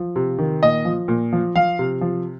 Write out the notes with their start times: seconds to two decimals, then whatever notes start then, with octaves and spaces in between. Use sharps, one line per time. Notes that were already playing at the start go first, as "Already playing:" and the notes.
Already playing: F3
0.16 C3
0.38 D#3
0.62 A#2 D#5
0.85 F3
1.08 A#2
1.33 F3
1.56 F3 F5
1.79 C3
2.01 F3